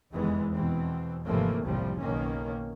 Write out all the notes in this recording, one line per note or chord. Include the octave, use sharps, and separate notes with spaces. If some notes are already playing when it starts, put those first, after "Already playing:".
F1 E2 D#3 E3 G#3 B3
E2 B2 E3 C4
G#1 C3 E3 F3 A3 A#3
F#1 C2 A2 C3 F3 G3
B1 B2 D#3 A#3 C#4